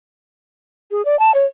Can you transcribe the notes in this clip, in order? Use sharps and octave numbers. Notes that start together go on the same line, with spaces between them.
G#4
D5
A5
C#5